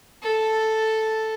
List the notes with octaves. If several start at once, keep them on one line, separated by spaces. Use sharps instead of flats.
A4